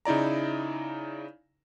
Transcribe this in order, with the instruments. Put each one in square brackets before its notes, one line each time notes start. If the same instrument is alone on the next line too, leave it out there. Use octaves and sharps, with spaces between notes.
[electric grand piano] C#3 D#4 E4 D5 A#5